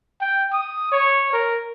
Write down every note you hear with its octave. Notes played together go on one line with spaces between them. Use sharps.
G5
D#6
C#5
A#4